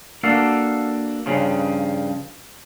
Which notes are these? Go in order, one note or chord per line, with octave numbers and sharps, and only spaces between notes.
A#3 D4 F#4 A4 F5
G2 C#3 F3 C#4